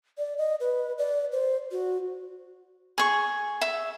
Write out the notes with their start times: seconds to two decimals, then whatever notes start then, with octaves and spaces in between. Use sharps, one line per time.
0.18 D5
0.38 D#5
0.60 B4
0.98 D5
1.32 C5
1.71 F#4
2.98 G#4 C#6
3.61 E5